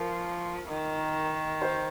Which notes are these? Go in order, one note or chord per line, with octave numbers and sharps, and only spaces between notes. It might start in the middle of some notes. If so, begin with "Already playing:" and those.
Already playing: F3 A#4
D#3
C5